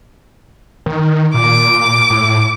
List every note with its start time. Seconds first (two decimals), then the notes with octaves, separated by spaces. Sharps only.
0.86 D#3
1.34 A#2 D6
2.10 A2